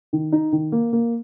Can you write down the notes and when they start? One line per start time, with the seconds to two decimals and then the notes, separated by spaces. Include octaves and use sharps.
0.13 D#3
0.32 D#4
0.52 D#3
0.72 A#3
0.93 A#3